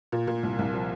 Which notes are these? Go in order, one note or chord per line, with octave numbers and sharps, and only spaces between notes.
A#2
A#2
C2
C2
F3